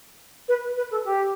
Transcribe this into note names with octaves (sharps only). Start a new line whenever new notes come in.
B4
B4
A4
G4